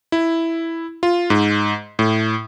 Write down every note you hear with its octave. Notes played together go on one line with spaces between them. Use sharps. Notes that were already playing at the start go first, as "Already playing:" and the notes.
E4
F4
G#2
A2